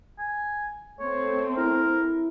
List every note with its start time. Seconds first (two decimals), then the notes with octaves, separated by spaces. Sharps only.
0.19 G#5
0.99 A3 C4 C#5
1.57 E4 A#4